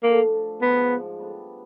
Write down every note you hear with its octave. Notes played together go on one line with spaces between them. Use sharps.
F3 A3 A#3 D4
G#2 F3 G#3 B3
G3 B3 D4